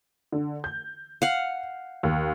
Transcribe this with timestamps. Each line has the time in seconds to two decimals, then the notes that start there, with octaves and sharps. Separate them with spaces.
0.32 D3
0.64 G6
1.22 F5 F#5
2.03 D#2